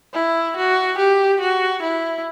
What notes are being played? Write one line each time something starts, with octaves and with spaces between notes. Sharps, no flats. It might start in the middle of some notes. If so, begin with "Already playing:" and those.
E4
F#4
G4
F#4
E4